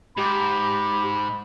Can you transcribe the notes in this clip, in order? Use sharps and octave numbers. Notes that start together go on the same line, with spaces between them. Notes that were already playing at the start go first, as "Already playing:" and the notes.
G#2 G4 B5